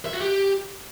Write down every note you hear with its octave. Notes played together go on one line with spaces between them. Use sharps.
E5
F#4
G4